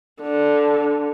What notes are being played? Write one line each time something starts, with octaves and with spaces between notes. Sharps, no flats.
D3